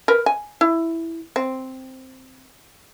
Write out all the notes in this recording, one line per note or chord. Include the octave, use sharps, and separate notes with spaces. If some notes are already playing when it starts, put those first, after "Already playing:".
A#4 B4
G#5
E4
C4